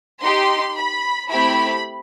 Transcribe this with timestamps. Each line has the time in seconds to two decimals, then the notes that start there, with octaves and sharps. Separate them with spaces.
0.23 D#4 G4 C6
0.77 B5
1.30 A3 C4 E4 G4 B5